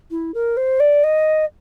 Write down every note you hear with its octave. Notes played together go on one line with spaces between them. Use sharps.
E4
A#4
C5
D5
D#5